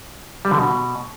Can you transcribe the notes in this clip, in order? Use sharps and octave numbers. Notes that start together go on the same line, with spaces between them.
G3
D3
B2